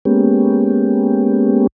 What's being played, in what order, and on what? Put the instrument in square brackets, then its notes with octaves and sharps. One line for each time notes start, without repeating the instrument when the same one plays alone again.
[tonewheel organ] G#3 A#3 B3 C#4 G4